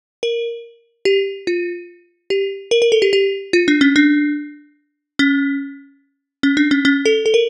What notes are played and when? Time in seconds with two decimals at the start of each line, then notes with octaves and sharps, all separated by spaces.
0.23 A#4
1.05 G4
1.47 F4
2.30 G4
2.71 A#4
2.82 A#4
2.92 A4
3.02 G4
3.13 G4
3.53 F4
3.68 D4
3.81 C#4
3.96 D4
5.19 C#4
6.43 C#4
6.57 D4
6.71 C#4
6.85 C#4
7.05 A4
7.26 A4
7.34 A#4